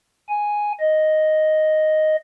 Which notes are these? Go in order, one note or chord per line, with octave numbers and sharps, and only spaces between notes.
G#5
D#5